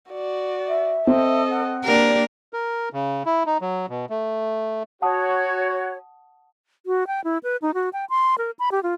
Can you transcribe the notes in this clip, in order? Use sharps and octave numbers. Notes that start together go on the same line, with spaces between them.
F#4 D5
E5
C4 A4 D#5
F#5
A#3 D4 G4 A#4 D5
A#4
C#3
E4
D#4
F#3
B2
A3
F#4 C#5 F#5 A5 D#6
F#4
G5
E4
B4
D#4
F#4
G5
C6
A#4
B5
G4
F4